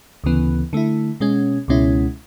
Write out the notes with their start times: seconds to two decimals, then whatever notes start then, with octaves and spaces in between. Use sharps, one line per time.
0.24 D2 C#3 E3 B3
0.73 D3 A3 E4
1.20 B2 G#3 C#4
1.68 C#2 B2 G#3 C#4 E4